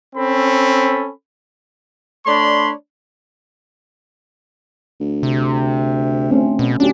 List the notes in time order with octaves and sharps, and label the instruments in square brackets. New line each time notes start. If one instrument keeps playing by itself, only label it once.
[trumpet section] C4 C#4 A4 B5
[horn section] A3 D4 C#5 D5 B5 C6
[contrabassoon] D2
[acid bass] C3
[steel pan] A3 C4 C#4
[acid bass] B2 [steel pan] C#4
[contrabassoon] D1 [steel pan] C#4 F#4 G4 [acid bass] D4